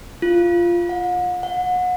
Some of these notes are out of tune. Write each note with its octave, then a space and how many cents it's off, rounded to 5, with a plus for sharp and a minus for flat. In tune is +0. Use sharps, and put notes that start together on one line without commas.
F4 -10
F#5 -45
F#5 -30